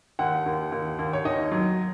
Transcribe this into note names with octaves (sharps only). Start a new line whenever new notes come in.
D#2 F#5
D#2
D#2
D#2
C#5
D#4 D#5
F#3